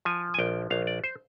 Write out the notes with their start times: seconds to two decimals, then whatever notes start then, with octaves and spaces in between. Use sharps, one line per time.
0.05 F3 G#5
0.34 G#5
0.39 A#1 G5
0.70 A#1 F5
0.87 D5
1.04 C5